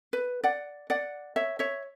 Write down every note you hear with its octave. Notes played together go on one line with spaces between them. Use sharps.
B4
D5 F#5
D5 F#5
C#5 E5
C#5 E5